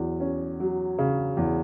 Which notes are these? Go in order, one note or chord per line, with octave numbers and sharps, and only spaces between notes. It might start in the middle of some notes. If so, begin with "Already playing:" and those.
Already playing: E2 F#3
C#4
F#3
C#3
E2